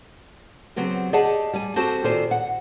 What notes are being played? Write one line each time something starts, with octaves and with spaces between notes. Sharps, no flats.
C#3 F#3 B3 C4 G4
G4 G#4 D5 D#5 F#5 A5
G3 G#5
C4 F#4 G4 A4 C5 A5
A#2 D#3 G4 A4 C5 G#5
F#5